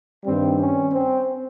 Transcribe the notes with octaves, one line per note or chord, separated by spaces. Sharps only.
G2 D#3 G3 C4
C#4
C4